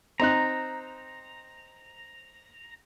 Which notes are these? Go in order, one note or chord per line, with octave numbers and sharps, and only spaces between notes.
C4 D#4 A#5 F#6